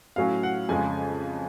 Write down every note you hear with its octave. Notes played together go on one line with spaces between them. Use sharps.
A2 F#3 C#4 F5
F#5
F2 C#3 G#3 G#5